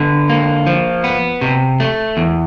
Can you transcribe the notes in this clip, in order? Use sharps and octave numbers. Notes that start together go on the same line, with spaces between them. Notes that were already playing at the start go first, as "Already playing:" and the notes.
Already playing: D3 B3
A#3
F3
B3
C3
A3
E2